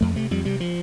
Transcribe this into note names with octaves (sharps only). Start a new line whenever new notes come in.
F2 A3
C3 A3
F2 G3
C3 G3
F3